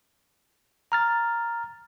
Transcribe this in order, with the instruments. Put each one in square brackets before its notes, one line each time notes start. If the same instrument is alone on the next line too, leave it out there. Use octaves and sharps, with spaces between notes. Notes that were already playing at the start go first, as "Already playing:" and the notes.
[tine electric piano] A#5 F6 A6